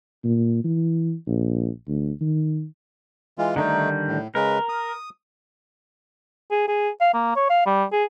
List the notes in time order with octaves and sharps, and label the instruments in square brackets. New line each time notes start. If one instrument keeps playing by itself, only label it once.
[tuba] A#2
E3
A#1
D2
D#3
[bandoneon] E3 G#3 F4
[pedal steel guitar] D3 D#3 G3 [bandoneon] A3 D#4
[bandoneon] A2
[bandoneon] C#3 G#3 B4 [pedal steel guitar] A#4
[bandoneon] D#6
[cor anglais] G#4
G#4
F5
A#3
C#5
F5
G3
G#4